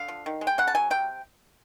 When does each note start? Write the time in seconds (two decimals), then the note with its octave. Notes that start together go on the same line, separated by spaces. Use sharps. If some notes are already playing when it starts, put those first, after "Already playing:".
Already playing: D3 F5
0.08 F3
0.26 D#3
0.41 G#3
0.47 G5
0.58 C#3 F#5
0.67 A5
0.75 F#3 G#5
0.91 C3 G5